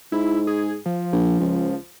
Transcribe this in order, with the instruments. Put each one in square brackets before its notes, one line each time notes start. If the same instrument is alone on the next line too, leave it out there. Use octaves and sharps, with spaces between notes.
[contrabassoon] G#2 [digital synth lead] E4
[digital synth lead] G#4
F3
[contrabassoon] A#1
C#2